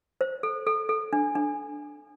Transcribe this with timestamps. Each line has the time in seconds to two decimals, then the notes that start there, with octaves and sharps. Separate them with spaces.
0.21 C5
0.43 A4
0.67 A4
0.89 A4
1.13 D4
1.35 D4